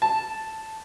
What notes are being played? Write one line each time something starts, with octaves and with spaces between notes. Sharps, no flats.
A5